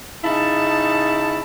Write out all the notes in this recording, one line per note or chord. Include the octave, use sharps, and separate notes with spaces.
C#3 D#4 E4 A5